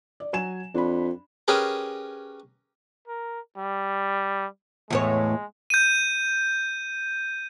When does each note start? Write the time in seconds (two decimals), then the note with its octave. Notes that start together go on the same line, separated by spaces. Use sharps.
0.20 D5
0.33 F#3 G#5 E7
0.74 F2 D4 B5
1.48 C#4 G4 G#4 A#4 B4
3.08 A#4
3.58 G3
4.90 E2 A2 G#3 C#5
5.70 G6 D#7